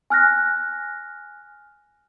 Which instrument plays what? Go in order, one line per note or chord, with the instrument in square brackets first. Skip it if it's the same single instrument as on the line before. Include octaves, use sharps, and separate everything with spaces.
[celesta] G#5 F6 F#6 A#6